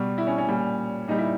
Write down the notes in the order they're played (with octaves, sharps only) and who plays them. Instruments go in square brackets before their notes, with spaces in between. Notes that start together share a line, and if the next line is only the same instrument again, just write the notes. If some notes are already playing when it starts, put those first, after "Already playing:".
Already playing: [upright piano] B2 G3
E4
C#4
C#4
A#2 G3
A#2 G3 D#4
E4